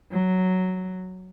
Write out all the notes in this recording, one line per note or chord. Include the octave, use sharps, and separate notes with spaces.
F#3